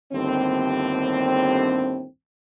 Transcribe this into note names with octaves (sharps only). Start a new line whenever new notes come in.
G1 D#2 A2 D3 C4